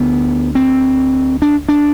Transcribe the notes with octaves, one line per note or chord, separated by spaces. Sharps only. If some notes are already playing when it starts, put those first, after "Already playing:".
Already playing: D2 D3 B3
C4
D4
D4